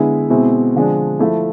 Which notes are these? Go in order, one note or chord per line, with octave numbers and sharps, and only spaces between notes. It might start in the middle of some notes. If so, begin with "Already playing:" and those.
Already playing: D3 G#3 B3 E4
B2 G#3 C4 E4
D3 F3 G#3 D4
F3 A3 E4